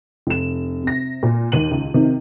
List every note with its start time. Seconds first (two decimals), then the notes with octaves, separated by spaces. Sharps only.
0.27 F1 E7
0.83 C3 A#6
1.23 A#2
1.52 D#2 D#3 D#7 F#7
1.71 C#2
1.94 C3 D#3